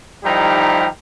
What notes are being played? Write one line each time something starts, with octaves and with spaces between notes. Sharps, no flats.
D#3 F3 G3 D#4 E4 G4